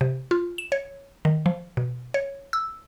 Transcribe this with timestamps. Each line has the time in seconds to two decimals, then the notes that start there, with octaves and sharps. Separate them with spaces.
0.01 C3
0.31 F4
0.58 E7
0.72 C#5
1.25 D#3
1.46 F3
1.77 B2
2.14 C#5
2.53 E6